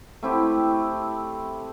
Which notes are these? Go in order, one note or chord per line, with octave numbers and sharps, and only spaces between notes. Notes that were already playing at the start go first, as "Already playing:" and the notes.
A3 C4 E4 G4